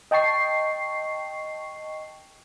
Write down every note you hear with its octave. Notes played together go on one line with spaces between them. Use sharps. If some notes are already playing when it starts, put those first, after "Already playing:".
D#5 G5 A5 C#6 C7